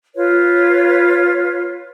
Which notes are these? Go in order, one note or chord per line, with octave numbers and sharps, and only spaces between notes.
F4 B4 C#5